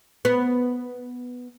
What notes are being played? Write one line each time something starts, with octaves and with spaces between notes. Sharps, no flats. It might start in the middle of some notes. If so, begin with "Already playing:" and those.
B3